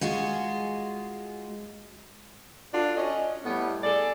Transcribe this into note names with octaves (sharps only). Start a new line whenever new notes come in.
G#3 F4 F#4 G#4
D4 F4 F#4 A4
C#4 D#5
A2 G3 B3
G#4 A4 D5